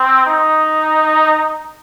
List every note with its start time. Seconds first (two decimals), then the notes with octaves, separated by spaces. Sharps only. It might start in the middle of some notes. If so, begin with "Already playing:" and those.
Already playing: C4
0.26 D#4